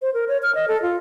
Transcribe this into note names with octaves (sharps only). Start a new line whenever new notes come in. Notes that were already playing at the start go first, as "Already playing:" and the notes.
C5
A#4
C#5
F6
D#5
A4
F4